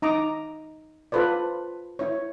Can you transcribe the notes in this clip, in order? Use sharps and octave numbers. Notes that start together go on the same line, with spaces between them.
D#4 A#5 D6 D#6
F4 A4 B4 C5 D5
E4 C#5